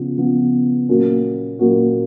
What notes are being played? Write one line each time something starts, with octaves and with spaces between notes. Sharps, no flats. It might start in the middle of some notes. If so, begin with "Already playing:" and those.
Already playing: C#3 F3 B3
C#3 F3 B3
A#2 F#3 A#3 C#4 F#4
A#2 F#3 A#3 C#4 F#4